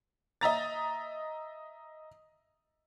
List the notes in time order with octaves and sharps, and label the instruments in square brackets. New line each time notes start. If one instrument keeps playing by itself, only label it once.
[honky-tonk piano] D#5 E5 A#5 A6